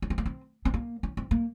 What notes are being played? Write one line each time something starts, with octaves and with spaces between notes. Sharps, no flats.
C#4
C4
A#3
C4
C4
A#3
C#4
C4
A#3